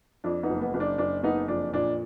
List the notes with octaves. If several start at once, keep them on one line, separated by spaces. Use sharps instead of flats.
F2 D4
B3 D#4
F#1
B3
F#1
D4
F#1 D4
F#1 B3 D#4
F2 D4
A#2 D4